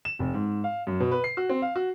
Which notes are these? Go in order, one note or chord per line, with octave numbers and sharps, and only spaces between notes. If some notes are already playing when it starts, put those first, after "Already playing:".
E7
F1
G#2
F5
F#2
B2
B4
C7
F#4
C4
F5
F#4